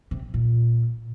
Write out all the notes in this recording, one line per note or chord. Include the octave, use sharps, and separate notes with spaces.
C3
A#2